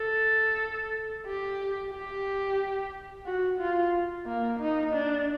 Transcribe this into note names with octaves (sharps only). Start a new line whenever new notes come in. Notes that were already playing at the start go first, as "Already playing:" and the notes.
Already playing: A4
G4
G4
F#4
F4
A#3
D#4
D4